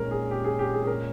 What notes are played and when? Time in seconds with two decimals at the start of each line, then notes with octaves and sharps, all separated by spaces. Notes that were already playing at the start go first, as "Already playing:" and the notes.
Already playing: A#2 G#3 C#4 A#4
0.11 G#4
0.31 G4
0.44 G#4
0.59 G4
0.74 G#4
0.84 G#4
0.87 A#4